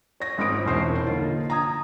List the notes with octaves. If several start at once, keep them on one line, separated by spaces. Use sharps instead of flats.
C#5 A#6
G#1 G#2 B5 D#6 D7
E1 C2 E3 C5 C#5 C7
A#2 D3 F3 D#4 F4
A#5 D#6 G#6